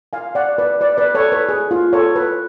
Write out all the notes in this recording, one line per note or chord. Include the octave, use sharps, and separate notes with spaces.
F5 G#5
D5 F#5
B4 D5
B4 D5
B4 D5
A4 C#5
B4
G#4
F4
A4 C#5
B4